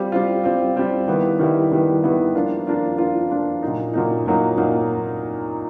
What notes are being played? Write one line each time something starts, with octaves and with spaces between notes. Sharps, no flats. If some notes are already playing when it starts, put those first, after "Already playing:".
Already playing: G3 C4 F4
G3 C4 F4
G3 C4 F4
G3 C4 F4
D#3 G3 B3 E4
D#3 G3 B3 E4
D#3 G3 B3 E4
D#3 G3 B3 E4
F3 A#3 D4 F4
F3 A#3 D4 F4
F3 A#3 D4 F4
F3 A#3 D4 F4
A#2 F#3 A#3 D#4
A#2 F#3 A#3 D#4
A#2 F#3 A#3 D#4
A#2 F#3 A#3 D#4